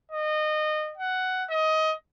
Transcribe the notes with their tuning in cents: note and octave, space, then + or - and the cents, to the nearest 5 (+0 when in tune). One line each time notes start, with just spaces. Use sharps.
D#5 -25
F#5 +10
D#5 +20